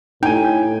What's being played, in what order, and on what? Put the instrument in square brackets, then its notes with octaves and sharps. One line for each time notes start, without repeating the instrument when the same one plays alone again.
[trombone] A2 [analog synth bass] D#4 [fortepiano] G5 G#5